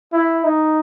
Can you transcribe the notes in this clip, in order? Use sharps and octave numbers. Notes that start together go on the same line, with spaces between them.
E4
D#4